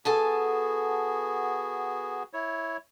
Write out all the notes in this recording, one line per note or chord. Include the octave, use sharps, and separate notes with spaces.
B3 F#4 G#4 A4 G#5 A5
E4 C#5